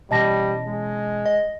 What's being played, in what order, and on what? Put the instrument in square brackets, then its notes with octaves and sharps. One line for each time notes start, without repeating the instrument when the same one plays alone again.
[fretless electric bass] B2 E3 C#4 [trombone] G3 [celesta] D#5 A5 A#6
[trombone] G#3
[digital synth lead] D#5